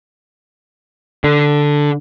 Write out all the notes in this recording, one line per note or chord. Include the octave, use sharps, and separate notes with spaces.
D3